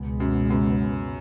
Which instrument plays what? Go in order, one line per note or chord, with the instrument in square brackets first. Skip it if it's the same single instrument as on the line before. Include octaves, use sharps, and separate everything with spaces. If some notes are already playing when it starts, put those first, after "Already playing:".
Already playing: [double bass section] C#2 B2 G#3 B3
[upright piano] F#2
F#2